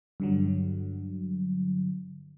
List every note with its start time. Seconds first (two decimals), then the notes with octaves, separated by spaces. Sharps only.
0.20 G2 D3 F#3